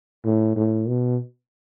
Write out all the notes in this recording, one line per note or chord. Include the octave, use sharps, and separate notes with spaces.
A2
A2
B2